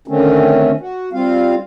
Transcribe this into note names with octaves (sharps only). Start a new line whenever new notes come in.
D3 D#3 A3 C4 C#4
F#4
G3 C4 F4 F5